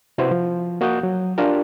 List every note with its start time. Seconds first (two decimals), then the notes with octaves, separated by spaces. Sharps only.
0.18 C3 E4 F#4 B4 C5
0.31 F3
0.81 A#3 F#4 D#6 F#6 G6
1.03 F#3
1.38 D4 F4 G4 A#4